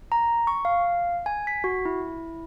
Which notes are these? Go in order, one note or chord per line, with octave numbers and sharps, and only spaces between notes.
A#5
C#6
F5
G#5
B6
F#4
E4